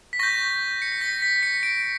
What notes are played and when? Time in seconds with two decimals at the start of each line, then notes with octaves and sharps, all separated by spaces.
0.13 B6
0.19 C#6 G6 A#6
0.82 C#7
0.92 B6
1.01 A#6
1.22 B6
1.43 C#7
1.63 D7